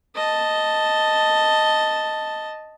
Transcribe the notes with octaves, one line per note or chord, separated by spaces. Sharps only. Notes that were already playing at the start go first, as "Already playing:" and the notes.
D#5 A5